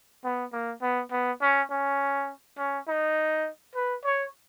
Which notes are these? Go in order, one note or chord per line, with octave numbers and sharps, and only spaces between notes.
B3
A#3
B3
B3
C#4
C#4
C#4
D#4
B4
C#5